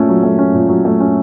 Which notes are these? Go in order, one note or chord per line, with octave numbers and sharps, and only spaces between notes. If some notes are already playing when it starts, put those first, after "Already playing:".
Already playing: A#2 A3 C#4
F#3
A3
C#4
A#2
F#3
A3
C#4